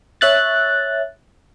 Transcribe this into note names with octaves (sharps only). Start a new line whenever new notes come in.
C#5 E5 F#6 A6